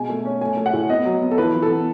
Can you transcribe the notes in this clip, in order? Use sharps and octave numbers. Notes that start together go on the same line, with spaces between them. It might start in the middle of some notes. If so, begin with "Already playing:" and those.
Already playing: B2 G#3 G#5
A3
C#4
A3 G#5
A3
F#5
A2
B3 D#5
F#3
B3
A4
E3 B4
E3
A4
B3